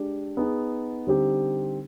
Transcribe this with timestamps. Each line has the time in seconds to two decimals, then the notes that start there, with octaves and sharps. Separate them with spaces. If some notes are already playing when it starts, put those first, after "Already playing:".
Already playing: G#3 D4 G4
0.37 B3 D#4 G#4
1.07 D3 G3 C4 D#4 G4